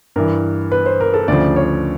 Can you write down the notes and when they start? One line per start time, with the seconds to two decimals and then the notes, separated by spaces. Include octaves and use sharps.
0.16 G2 E3 A#4
0.72 B4
0.86 C5
1.00 A#4
1.14 A4
1.28 D2 C#3 F3 D5
1.56 C#5